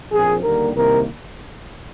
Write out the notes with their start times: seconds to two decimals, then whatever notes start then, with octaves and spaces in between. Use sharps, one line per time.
0.11 A#1 A#2 F3 C4 G#4
0.43 D#2 D3 G3 A#3 A#4
0.75 C2 C3 D#3 A#3 A#4